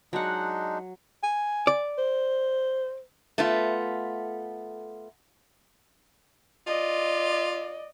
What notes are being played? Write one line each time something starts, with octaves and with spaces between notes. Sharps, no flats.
F#3 G#3 D4 D#4 F#5
G#5
D5
C5
A3 B3 F4
F4 D5 D#5